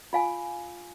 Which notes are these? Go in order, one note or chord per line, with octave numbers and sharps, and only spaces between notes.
F4 F5 G#5